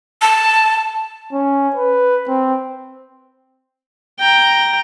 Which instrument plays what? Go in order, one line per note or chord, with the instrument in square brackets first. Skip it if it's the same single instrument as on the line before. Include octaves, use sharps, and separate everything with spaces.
[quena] A5
[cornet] C#4
B4
C4
[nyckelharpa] G5 A#5